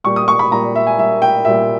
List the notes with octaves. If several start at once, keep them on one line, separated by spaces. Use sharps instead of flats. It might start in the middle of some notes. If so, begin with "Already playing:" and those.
A#2 G3 C#6
D#6
C#6
B5
A#2 G3 A#5
E5
G#5
A#2 G3 E5
G5
A#2 G3 E5